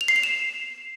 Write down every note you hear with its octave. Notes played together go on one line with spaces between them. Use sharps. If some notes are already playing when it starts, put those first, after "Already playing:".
F7
C7
F7
E7